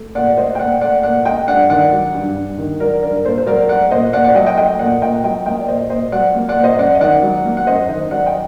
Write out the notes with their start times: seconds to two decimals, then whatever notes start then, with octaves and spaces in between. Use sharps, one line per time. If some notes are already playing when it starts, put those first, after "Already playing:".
Already playing: A3
0.15 A#2 D5 F#5
0.29 D5
0.37 A3 C5 D#5
0.55 G5
0.59 A#2 D5 F#5
0.81 A3 D5 F#5
1.03 A#2 D5 F#5
1.25 A3 D#5 G5
1.48 G2 D5 F#5
1.70 D#3 D5 F#5
1.93 F#3
2.15 G2
2.36 G2
2.58 D#3
2.80 F#3 A#4 D5
3.03 G2 A#4 D5
3.25 A#2 A4 C5
3.38 C5
3.46 F#3 A#4 D5
3.69 A3 D5 F#5
3.91 A#2 C5 D#5
4.13 A#2 D5 F#5
4.24 D5 F#5
4.35 F#3 D#5 G5
4.46 D#5 G5
4.57 A3 D#5 G5
4.79 A#2 D5 F#5
5.02 A#2 D#5 G5
5.24 F#3 D#5 G5
5.46 A#3 D#5 G5
5.60 D5
5.68 A#2 C5 D#5
5.90 A#2 C5 D#5
6.12 F#3 D5 F#5
6.35 A#3
6.49 D5 F#5
6.56 A#2
6.63 C5 D#5
6.79 F#2 D5 F#5
6.95 D#5
7.01 D#3 D5 F#5
7.23 F#3
7.45 A#3
7.57 F#5
7.67 F#2 C5 D#5
7.89 D#3 C5 D#5
8.11 F#3 D5 F#5
8.26 D#5 G5